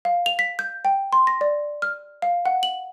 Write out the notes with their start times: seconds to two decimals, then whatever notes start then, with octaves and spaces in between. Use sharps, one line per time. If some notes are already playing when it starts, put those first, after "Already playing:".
0.05 F5
0.26 F7
0.39 B6
0.59 G6
0.85 G5
1.12 C6
1.27 A#6
1.41 D5
1.82 F6
2.22 F5
2.46 F#5
2.63 F#7